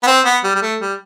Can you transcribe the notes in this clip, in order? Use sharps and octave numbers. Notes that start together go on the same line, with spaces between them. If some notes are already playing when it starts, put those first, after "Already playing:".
B3
C4
B3
G3
G3
A3
G3